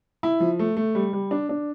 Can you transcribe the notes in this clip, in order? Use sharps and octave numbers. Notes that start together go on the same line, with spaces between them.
E4
F3
A3
A3
G3
G3
D4
D4